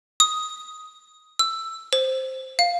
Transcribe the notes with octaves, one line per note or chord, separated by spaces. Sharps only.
D#6
E6
C5
F5